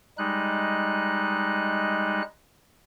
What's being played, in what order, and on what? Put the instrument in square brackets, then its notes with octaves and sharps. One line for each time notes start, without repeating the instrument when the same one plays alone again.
[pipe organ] G3 G#3 D#4 F#6